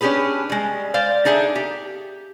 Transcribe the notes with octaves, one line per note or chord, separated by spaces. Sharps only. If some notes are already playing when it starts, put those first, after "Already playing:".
C#4 D4 G4 G#4 B4
G3 G#3
C5 D5 F5
D4 D#4 G#4 A4 E5
G4